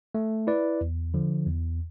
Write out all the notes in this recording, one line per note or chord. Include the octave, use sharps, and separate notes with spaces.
A3
E4 B4 D5
E2
D3 F3
E2